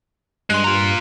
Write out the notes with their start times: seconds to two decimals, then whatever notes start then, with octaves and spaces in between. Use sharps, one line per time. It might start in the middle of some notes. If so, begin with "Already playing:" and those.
0.50 G2 G#3 C6 F#6
0.64 F4 A#5